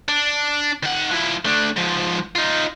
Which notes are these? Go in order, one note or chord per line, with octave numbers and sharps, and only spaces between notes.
D4
D#3 F#5
F3 E4
A3 D4
G#2 F3
D#4 F4